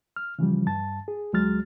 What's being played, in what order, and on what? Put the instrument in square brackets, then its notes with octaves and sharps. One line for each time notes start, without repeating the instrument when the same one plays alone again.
[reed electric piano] F6
C#3 E3 F3 G3
G2 A5 A6
G#4
D2 F#3 G#3 F6 A6